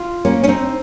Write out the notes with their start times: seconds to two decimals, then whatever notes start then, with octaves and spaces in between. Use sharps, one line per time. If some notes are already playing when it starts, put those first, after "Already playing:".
Already playing: F4
0.25 A#3 C#4
0.43 C#4
0.48 C4 D#4